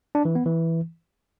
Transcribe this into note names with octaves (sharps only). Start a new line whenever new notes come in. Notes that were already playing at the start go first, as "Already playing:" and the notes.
D4
E3
B3
E3